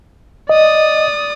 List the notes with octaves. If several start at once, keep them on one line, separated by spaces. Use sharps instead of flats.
D5 D#5 D#6